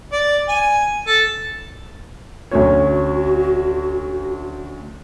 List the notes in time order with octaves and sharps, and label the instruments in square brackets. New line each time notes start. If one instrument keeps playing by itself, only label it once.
[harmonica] D5
G#5
A4
[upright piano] D2 C#4 C#5 [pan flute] F#4